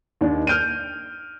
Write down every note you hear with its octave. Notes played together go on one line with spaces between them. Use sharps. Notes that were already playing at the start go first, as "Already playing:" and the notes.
D#2 D#3 D4
F6 G6 D7 D#7